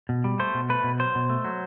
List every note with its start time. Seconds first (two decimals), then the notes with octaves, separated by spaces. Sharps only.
0.09 B2
0.24 G3
0.39 A3 C5
0.54 B2
0.69 A3 B4
0.84 B2
0.99 F#3 C5
1.15 B2
1.30 A3
1.45 F#3